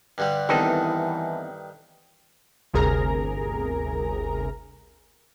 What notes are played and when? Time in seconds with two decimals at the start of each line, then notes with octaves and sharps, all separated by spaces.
0.18 G2 D3 G3
0.49 G2 D#3 E3 B3 C4 D#4 A4
2.74 G1 D2 C3 G#4 A#4 A#5